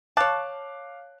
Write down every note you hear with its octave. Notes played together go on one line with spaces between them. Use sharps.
C#5 F5 A5 D6 F#6